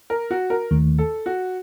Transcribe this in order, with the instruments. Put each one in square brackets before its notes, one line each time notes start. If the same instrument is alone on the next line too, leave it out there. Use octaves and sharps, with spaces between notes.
[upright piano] A#4
F#4
A#4
[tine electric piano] D#2 D#3 A3
[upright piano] A4
F#4